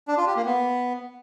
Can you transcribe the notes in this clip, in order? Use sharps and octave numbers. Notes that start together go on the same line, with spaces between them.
D4
F4
G4
A#3
B3